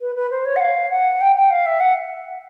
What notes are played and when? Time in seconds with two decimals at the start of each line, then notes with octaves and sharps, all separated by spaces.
0.01 B4
0.15 B4
0.31 C5
0.45 C#5
0.56 F#5
0.60 F5
0.90 F#5
1.21 G5
1.36 G5
1.50 F5
1.66 E5
1.80 F#5